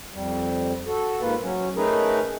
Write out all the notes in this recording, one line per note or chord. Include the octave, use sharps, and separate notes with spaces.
F2 G3
F#4 A4
G#2 A#3 F4 B4
F#3 C#4
A3 C#4 D#4 G#4 A#4 B4